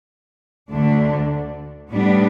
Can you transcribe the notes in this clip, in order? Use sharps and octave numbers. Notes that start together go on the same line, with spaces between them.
D2 D3 A3 D4
A2 G3 B3 D4